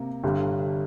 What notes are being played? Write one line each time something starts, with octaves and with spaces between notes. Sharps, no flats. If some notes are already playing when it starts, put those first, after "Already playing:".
Already playing: C3 A#3
G1 G2 D3 G3